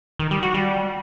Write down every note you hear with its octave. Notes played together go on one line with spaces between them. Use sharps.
D#3
G3
F#4
G3